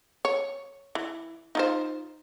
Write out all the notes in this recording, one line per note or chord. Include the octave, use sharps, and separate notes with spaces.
C#5
E3
D#4 F4 C5